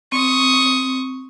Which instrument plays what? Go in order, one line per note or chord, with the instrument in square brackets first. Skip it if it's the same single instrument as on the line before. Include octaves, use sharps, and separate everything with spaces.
[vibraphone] C4 [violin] C#6 D#6